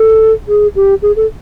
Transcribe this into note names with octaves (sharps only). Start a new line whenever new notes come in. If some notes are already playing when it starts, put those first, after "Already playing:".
Already playing: A4
G#4
G4
G#4
A4